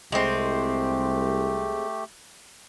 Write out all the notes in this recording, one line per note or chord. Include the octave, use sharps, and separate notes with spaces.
C2 G#3 A3 C4 G4